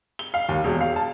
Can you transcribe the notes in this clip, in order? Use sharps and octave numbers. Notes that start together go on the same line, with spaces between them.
G7
F5
D#2
E1
F5
A5